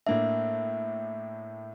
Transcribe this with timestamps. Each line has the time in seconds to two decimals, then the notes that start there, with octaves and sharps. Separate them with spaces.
0.07 A2 A#3 D4 E5